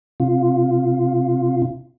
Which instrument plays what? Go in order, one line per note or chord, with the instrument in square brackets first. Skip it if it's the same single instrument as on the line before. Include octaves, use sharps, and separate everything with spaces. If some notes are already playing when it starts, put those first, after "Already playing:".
[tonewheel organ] C3 F4